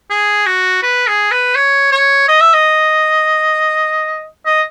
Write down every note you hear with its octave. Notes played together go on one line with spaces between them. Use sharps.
G#4
F#4
B4
G#4
B4
C#5
C#5
D#5
E5
D#5
D#5